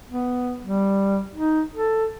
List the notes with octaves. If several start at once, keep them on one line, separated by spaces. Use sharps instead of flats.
B3
G3
D#4
A4